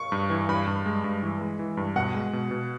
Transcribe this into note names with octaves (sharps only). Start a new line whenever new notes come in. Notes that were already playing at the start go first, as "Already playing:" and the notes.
Already playing: C#6
G2
E3
G2 B5
G2
G#3
G2
E3
G#3
E3
G2
B2 F#5
G#3
B2
B2